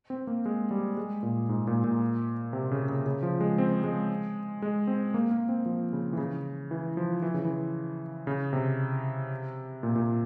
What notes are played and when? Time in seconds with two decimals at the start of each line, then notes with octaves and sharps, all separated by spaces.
0.10 C4
0.27 A#3
0.46 G#3
0.71 G3
0.97 G#3
1.23 A#2
1.49 G#2
1.67 A#2
1.84 A#2
2.53 C3
2.71 C#3
2.89 C#3
3.06 C#3
3.23 F3
3.40 G#3
3.58 C4
3.84 G#3
4.62 G#3
4.87 C4
5.14 A#3
5.31 A#3
5.49 C4
5.66 F3
5.93 C#3
6.13 E3
6.18 C#3
6.71 E3
6.97 F3
7.22 E3
7.34 C#3
7.45 E3
8.27 C#3
8.53 C3
9.83 A#2
9.96 A#2